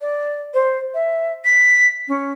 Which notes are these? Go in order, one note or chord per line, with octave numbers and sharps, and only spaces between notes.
D5
C5
E5
B6
C#4